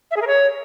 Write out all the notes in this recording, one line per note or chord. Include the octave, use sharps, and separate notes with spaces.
E5
G#4
A#4
C#5